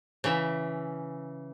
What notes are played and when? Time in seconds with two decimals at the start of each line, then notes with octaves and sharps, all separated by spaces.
0.24 C#3 E3 E5